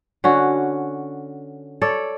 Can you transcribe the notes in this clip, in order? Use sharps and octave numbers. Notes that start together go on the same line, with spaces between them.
D3 C#4 F#4
A4 C#5 D5